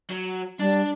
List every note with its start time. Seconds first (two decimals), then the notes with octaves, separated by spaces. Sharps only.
0.10 F#3
0.59 G3 D4